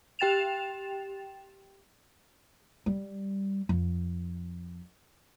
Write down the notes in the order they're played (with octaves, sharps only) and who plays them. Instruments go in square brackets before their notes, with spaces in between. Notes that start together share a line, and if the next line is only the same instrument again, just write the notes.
[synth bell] G4 G5 A6 E7 F7
[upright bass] G3
F2